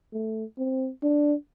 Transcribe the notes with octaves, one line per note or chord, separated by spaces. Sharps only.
A3
C4
D4